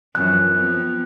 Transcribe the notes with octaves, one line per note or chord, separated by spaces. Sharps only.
F#2 E3 F3 F#6
F3 B3 C4